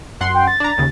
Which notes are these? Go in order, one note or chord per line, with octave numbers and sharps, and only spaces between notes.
F#2 F#5 C6
G5
A6
D4 A#5
D#2 C#3